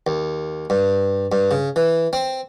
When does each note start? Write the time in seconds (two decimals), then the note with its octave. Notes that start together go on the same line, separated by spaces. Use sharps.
0.07 D#2
0.70 G2
1.32 G2
1.51 C#3
1.76 E3
2.13 C4